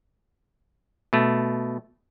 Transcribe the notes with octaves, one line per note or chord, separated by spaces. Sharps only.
B2 A3